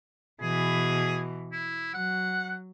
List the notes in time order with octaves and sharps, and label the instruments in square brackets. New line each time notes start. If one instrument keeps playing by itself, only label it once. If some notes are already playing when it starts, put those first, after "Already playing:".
[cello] B2 E3 [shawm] G#4
[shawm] E4
[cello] F#3 [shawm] F#5